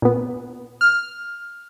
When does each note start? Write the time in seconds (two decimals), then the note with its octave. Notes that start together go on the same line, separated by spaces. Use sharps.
0.02 A#2 B3
0.81 F6